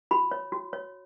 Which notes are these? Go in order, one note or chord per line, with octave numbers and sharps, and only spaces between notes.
F#4 B5
C#5
F#4
C#5